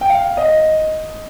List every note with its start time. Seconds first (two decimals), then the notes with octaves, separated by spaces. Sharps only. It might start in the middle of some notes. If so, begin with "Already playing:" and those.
0.01 G5
0.10 F5
0.37 D#5